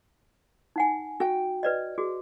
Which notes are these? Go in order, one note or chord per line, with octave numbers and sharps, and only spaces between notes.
D#4 F#5 G#5
F#4 G5
B4 D5 D#5
F#4 G#4